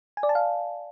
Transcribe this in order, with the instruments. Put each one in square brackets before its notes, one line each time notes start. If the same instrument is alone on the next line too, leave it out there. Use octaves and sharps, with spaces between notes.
[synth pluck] G#5
D5
A5
F5